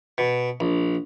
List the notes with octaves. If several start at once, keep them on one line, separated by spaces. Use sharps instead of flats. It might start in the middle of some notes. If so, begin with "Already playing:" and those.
B2
A#1